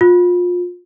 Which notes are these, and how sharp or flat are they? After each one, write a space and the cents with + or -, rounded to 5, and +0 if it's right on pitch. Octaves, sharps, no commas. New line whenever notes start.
F4 +30